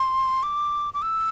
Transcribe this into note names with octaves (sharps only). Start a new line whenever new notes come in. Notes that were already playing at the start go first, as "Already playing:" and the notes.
Already playing: C6
D6
D6
E6